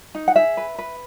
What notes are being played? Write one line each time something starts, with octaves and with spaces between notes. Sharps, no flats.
D#4
F#5
G#4 E5
B4
B4